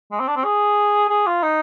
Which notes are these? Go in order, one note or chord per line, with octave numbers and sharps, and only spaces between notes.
G#3
C4
D4
C4
G#4
G#4
F4
D#4